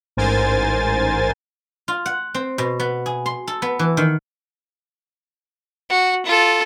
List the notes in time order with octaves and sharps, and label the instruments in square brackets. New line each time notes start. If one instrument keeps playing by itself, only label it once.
[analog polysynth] A1 G#2 A#4 C5 G#5 A6
[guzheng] F4
F#5
C4
B2
B3
G#4
C6
A4
B3
E3
D#3
[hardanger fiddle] F#4
F4 A4